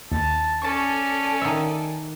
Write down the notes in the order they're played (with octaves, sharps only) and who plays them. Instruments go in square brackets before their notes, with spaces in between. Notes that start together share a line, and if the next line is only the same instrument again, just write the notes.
[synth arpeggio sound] D#2 [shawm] A5
[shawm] C#4 [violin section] A4 D5 G#5 [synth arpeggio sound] A5 C#6
[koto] D#3 E5